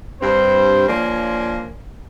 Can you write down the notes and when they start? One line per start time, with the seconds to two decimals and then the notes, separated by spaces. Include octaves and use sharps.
0.21 G2 C4 C5
0.88 F3 A#3 D4 C#5 G#5 C6